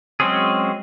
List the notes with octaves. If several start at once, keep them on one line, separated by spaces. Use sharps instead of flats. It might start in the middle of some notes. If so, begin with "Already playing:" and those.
F#3 G#3 C4 C#4 G#4